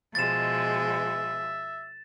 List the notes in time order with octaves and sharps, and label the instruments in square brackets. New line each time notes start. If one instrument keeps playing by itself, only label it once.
[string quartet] B2 F3 G#3 [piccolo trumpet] E5 [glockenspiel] A6 E7